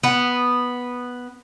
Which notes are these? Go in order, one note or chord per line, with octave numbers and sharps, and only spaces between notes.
B3